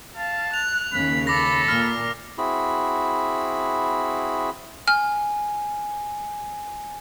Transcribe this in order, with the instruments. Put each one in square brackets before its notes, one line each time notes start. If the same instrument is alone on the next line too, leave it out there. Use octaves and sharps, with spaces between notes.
[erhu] F5 [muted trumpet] A5
[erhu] F#6 [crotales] F7
[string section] D#2 C#3 [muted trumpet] B5
[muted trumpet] A4 [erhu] B5 [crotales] D6 A#6
[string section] A#2 [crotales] F6
[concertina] C4 E4 F#4 G#4 B5
[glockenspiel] G#5 [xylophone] F6